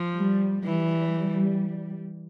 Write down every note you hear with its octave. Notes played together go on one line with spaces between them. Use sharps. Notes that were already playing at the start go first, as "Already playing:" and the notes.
Already playing: F3
G3
E3 G3